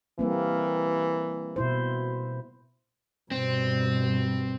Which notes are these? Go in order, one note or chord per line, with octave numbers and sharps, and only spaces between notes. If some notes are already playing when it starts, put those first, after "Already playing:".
E3 G3 A#3 C4
B2 E4 C5
G2 B2 C4